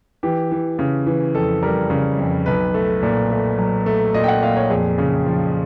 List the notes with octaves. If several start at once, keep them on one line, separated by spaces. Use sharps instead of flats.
E3 G4
E3
C#3
E3
F2 A4
G3 A#4
C#3
F2
B1 B4
A3
A#2
A3
F#3
A3
A#2 D#5
G5
F#5
A#2 F5
C#5
F2 G#4
C#3
F3